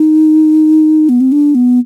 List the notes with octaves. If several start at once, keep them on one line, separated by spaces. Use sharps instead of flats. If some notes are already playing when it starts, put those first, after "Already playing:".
Already playing: D#4
B3
C4
D4
B3